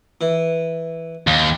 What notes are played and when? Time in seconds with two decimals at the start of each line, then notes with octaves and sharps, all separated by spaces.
0.21 E3
1.27 D#2